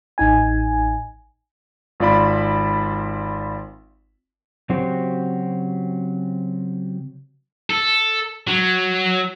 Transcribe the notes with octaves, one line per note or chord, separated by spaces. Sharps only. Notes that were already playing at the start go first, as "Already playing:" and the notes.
A1 D#4 G#5
G#1 F4 D5 B5
C#3 F#3 C4 F#4 G4 C5
A4
F#3